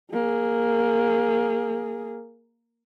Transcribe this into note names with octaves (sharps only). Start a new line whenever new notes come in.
A#3 G#4